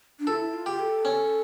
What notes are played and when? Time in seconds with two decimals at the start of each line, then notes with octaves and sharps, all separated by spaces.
0.19 D4
0.27 F4 A4
0.33 E4
0.53 F4
0.66 G4
0.79 A4
1.05 C#4